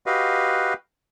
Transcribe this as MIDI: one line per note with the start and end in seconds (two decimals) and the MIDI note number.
0.06 0.74 66
0.06 0.74 67
0.06 0.74 71
0.06 0.74 75
0.06 0.74 77